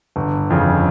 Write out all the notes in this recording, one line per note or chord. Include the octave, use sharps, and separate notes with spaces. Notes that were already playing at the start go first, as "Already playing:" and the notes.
G1
F2 C#3